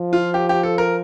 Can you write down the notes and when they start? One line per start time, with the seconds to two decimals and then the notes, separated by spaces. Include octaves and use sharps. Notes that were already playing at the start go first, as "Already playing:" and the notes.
Already playing: F3
0.13 F4
0.34 G4
0.49 G4
0.63 A4
0.78 A#4